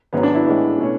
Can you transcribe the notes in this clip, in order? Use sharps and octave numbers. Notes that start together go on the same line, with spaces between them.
G#1 G#2 F#3 B3
D4
E4
A1 A2 E3 G#3
B2 A3 C#4